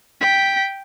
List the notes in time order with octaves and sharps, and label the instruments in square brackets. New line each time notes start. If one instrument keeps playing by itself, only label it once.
[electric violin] G5 B6